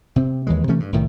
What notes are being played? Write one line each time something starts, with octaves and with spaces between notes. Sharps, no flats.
C3 C4
D#2 E3 G#3
C3 E3 A3 C#4
G2
C2 A2 D#3